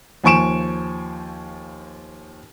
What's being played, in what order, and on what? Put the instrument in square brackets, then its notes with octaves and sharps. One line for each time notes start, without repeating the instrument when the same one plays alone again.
[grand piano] D#2 F3 G#5 C#6 D7 E7